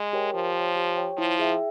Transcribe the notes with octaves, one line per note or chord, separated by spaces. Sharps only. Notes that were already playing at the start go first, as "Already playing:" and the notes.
Already playing: G#3
G4 A#4 C#5 G5
F3 G4
C#5 G5
G4
C#5 G5
F3 E4
G#4 E5 G5